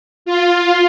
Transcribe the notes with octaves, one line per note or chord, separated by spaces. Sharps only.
F4